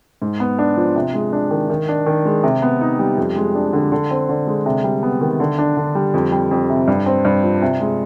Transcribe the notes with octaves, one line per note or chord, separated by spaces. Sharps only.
G#2
B3
D4
F3
C3
G#3
D4
D#3
D#3
D4
D#3
G#3
C3
B3
D#4
G3
F2
G#3
D4
D3
D3
C4
D3
G#3
C3
G3
B3
D#3
D3
D4
D3
G3
F2
G3
F2
C3
G2
C4
G2
F3
C3
G#3